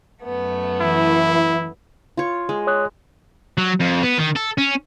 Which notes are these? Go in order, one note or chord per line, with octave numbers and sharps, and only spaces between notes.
F#2 A3 B3
E3 E4
F4 C#5
G#3
C#5 D#6 F#6
F#3
F2
B3
D#3
A4
C#4